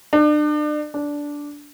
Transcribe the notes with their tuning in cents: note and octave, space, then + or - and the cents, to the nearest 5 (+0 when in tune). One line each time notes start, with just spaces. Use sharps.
D4 +35
D4 -10